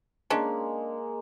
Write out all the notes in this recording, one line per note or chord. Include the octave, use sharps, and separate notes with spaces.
G#3 A#3 C#4 D4